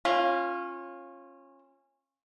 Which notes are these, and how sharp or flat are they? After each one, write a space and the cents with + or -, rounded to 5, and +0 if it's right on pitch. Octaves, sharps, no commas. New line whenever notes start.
A#3 +0 C#4 -20 F4 +0